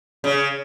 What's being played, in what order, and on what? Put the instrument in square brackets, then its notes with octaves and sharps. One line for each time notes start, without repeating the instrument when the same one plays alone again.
[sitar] C#3